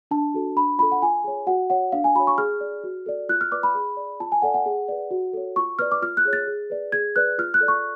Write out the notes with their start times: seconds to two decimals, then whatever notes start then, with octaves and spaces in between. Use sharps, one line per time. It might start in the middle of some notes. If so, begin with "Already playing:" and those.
0.11 D4 A5
0.34 F#4 A4
0.56 D4 B5
0.78 F4 A4 B5
0.92 F#5
1.02 F4 G#5
1.24 G#4 C#5
1.47 F#4 F#5
1.70 C#5 F#5
1.92 D4 F5
2.04 G#5
2.15 F#4 C#5 B5
2.27 C#6
2.38 G#4 F6
2.61 D5
2.84 F#4
3.06 A4 D5
3.29 F4 F#6
3.41 F6
3.52 B4 D5 D6
3.63 B5
3.75 G#4
3.97 D5
4.20 F4 A5
4.32 G#5
4.42 A4 D5 F#5
4.54 F#5
4.66 G#4
4.88 B4 D5
5.11 F#4
5.33 A4 C#5
5.56 F4 C#6
5.79 B4 D5 F6
5.92 D6
6.02 F4 F6
6.17 F#6
6.25 G#4 C#5
6.33 A6
6.47 G#4
6.70 B4 D5
6.92 G#4 G#6
7.16 B4 D5 F#6
7.38 F4 F6
7.54 F#6
7.61 A4 D5
7.68 C#6